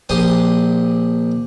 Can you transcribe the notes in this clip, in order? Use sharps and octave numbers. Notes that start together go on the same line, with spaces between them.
A#1 G4 C6 D6 D#6